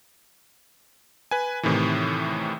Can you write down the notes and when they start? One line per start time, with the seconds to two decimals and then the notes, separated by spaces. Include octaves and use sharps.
1.31 B4 G#5
1.63 A2 C3 D#3 E3